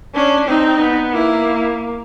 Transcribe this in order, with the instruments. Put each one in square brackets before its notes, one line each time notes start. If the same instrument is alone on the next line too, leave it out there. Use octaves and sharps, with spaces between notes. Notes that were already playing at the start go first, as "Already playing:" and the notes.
[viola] C#4 [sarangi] D4
[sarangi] C4 [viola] D#4
[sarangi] B3
[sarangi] A#3 [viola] E4